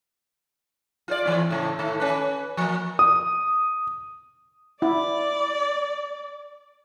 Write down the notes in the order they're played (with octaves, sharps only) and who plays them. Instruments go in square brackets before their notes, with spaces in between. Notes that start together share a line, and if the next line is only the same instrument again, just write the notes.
[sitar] F4 C5 D5
A2 E3 C4
A2 C#3 A3
A2 D#3 A3
C#4 B4
F3 A#3
[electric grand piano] D#6
[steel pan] E4 [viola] D5